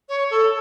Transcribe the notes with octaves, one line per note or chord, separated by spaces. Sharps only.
C#5
A4